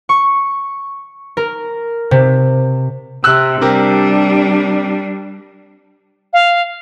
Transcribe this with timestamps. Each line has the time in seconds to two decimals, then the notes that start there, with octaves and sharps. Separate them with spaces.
0.09 C#6
1.37 A#4
2.11 C3
3.24 C3 E6 F#6
3.61 C3 G3 D4 G4 A#4
6.33 F5